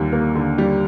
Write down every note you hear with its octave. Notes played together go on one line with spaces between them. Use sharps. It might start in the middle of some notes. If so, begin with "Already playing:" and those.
Already playing: D#2 D3 G3
A#3
D3
G3